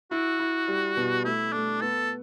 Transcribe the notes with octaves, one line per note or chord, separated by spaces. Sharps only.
E4 F#4
E4
G3
B2
A3 E4
A3 D4
B3 A4